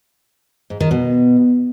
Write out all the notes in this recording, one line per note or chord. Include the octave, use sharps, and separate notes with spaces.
G#2
D#3
B2